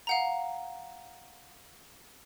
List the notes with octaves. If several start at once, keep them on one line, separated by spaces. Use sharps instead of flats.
F5 F#5 A#5